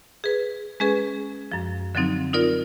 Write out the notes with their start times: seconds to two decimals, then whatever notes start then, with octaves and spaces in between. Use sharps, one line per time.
0.24 G#4 B4
0.80 G#3 C#4 G#4 B4
1.52 F#2 F3
1.95 D3 F3 F#3 C4 D#4
2.33 D#4 F4 A#4 D5